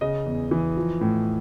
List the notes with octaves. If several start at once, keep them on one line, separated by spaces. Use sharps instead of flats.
C#3 D#5
E2
E3
F3
A2